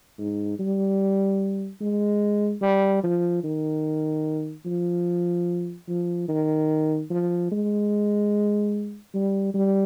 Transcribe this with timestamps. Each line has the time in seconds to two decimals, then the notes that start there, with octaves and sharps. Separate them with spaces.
0.19 G#2
0.59 G3
1.81 G#3
2.62 G3
3.04 F3
3.44 D#3
4.66 F3
5.89 F3
6.29 D#3
7.11 F3
7.52 G#3
9.14 G3
9.54 G3